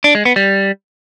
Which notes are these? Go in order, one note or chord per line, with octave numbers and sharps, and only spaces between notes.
D4
G#3
B3
G3